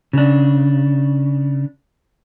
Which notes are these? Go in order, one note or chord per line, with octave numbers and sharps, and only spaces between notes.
C#3 D4